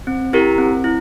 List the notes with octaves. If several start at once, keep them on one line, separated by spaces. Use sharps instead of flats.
C4
E4 G4 A#4
C4
E4